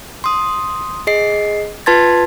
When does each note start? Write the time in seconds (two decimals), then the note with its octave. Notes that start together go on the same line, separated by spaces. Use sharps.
0.24 C6 D#6
1.07 G#4 D#5 C7
1.86 F4 B4 A5 C6 G#6 A6